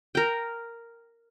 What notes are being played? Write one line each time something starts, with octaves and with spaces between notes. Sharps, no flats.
A#4 G5